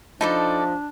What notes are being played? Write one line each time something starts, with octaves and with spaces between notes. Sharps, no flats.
F3 D4 D#4 A4 D5 D#5 A5 B5